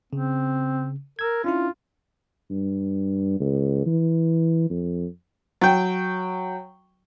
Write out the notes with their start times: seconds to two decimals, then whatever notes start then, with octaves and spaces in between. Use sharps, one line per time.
0.13 C#3 C4
1.19 A#4 E6 G#6
1.44 C#4 D4 E4 F4
2.50 G2
3.40 C#2
3.86 E3
4.70 F2
5.61 F#3 G5